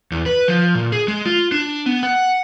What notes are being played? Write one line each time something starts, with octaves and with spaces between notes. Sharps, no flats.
E2
B4
F3
A#2
G#4
G#3
F4
D4
B3
F#5